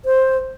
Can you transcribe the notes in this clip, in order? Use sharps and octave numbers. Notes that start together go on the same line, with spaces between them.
C5